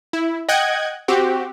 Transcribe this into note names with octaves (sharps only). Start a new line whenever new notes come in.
E4
D#5 F#5 G5 F#6 G#6
C4 F#4 G4